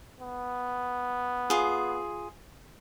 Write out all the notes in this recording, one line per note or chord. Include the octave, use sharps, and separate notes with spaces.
B3
F4 G#4